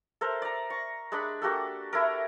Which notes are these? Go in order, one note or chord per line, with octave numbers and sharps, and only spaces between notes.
A4 A#4 C5
D5 A#5
C#6
G#3 D4 B5
A#3 F#4 G4 A4
E4 A4 A#4